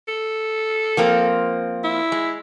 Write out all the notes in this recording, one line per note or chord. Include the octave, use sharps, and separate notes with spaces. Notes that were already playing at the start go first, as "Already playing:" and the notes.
A4
F3 A#3 C4
E4
G#3